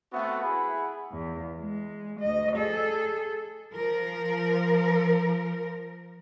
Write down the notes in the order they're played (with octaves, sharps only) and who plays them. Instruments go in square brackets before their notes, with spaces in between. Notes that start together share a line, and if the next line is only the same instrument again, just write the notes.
[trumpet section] A3 B3 C4 F#4 E5 F#5
E4 G#4 F#5 B5
[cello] E2
G#3
D2 D#5
G#4 A4
[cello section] F3 A#4